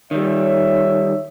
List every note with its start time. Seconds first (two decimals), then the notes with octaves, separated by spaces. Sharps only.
0.11 D#3 G3 C#5 E5